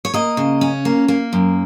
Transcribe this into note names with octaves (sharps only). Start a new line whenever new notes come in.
C#5
A#3 D#5
C#3
C#4
A#3
A#3
F#2